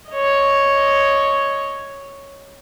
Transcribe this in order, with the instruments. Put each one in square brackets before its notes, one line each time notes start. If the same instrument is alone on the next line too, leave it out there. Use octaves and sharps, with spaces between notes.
[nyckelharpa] C#5 D#5